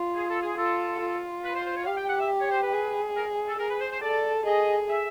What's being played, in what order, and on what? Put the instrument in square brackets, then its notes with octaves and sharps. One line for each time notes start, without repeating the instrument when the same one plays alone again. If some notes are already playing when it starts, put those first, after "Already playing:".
Already playing: [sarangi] F4
[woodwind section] G#4
A4
G#4
[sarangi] F4 [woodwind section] A4
[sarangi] F4
[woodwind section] B4
C5
C5
C#5
[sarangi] G4 [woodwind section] F5
[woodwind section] G5
F#5
E5
C#5
C5
B4
[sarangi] G#4
[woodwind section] A#4
A4
[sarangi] G#4 [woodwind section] A#4
[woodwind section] B4
C5
C5
[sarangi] A4 [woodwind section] D5
[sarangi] G#4 [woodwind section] D#5
[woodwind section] E5